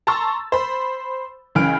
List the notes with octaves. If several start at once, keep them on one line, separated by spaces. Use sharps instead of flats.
A5 A#5 C6 C#6 E6 A6
C5 B5
C#2 C#3 E3 B5 F6 D7